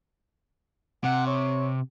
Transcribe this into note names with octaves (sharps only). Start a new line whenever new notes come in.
C3 F#5
C#5